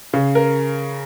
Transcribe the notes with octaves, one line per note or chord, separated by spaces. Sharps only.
C#3
A#4